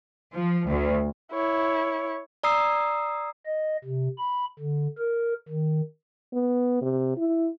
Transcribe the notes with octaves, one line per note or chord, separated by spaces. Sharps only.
F3
D2
E4 C#5
D5 A#5 D#6 E6 C7
D#5
C3
B5
D3
A#4
D#3
B3
C3
E4